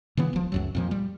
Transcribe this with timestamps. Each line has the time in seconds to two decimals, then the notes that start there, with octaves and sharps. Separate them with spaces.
0.17 C#3 E3 B3
0.33 D1 F3
0.52 C#2 F#2 F#3
0.75 F2 A#2 F3
0.91 G3